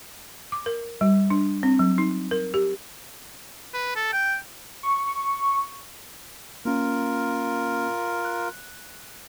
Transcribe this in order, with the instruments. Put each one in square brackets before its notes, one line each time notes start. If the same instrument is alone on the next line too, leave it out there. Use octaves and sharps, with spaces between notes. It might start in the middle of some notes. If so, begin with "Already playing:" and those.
[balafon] D6
A#4
G3
D4
C4
F#3
D#4
A#4
G4
[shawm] B4
A4
G5
[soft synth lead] C#6
[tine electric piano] A#3 C#4 [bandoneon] F4 A#4
[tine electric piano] F#6